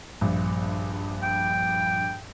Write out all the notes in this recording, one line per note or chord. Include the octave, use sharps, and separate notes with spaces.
A#1 G2
G5